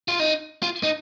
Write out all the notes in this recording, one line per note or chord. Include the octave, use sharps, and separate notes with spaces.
F4
D#4
F4
D#4